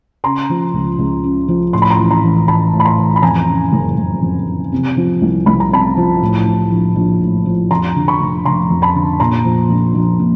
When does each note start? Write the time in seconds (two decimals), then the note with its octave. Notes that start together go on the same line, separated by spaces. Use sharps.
0.24 C#3 A#5 C6
0.50 F3
0.74 C#2
0.99 C#2
1.24 C#3
1.48 F3
1.73 A2 C6
1.82 B5
1.91 A#5 C6
1.98 E3
2.10 A#5 C6
2.23 A1
2.48 A1 A5 B5
2.73 A2
2.80 B5
2.85 A#5 C6
2.98 E3
3.16 B5
3.22 F2 G#5 A#5
3.47 C#3
3.73 F#1
3.97 F#1
4.22 F2
4.47 C#3
4.72 C3
4.97 F3
5.22 C2
5.46 C2 B5
5.60 A#5
5.71 C3 A5 B5
5.97 F3
6.21 A2
6.46 F3
6.71 A#1
6.96 A#1
7.21 A2
7.46 F3
7.70 F2 A#5 C6
7.95 D3
8.08 B5 C#6
8.20 F1
8.45 F1 A#5 C6
8.70 F2
8.82 A5 B5
8.95 D3
9.20 A#2 A#5 C6
9.45 F3
9.70 A#1
9.95 A#1
10.19 A#2